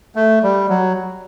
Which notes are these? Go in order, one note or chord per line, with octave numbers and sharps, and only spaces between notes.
A3
G3
F#3